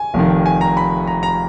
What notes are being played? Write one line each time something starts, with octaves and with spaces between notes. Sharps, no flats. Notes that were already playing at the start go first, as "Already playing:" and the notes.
Already playing: G#5
F1 F2 D#3
G#5
A#5
B5
A#5
A#5